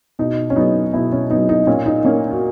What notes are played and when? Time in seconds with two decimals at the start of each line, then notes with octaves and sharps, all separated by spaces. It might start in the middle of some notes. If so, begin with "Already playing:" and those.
0.19 B2 D#4
0.50 C#4
0.56 F#3 B3 D#4
0.93 B2 E4
1.12 C#4
1.30 F#3 B3 D#4
1.49 D#4
1.67 A#2 C#4
1.86 D#4
2.04 A#3 C#4
2.31 F#4